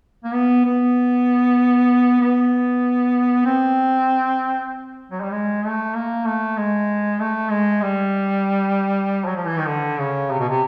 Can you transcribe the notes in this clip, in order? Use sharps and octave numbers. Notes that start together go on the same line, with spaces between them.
A#3
B3
B3
B3
C4
F#3
G3
G#3
A3
A#3
A3
G#3
A3
G#3
G3
F#3
F3
E3
D#3
D3
C#3
C3
B2
C3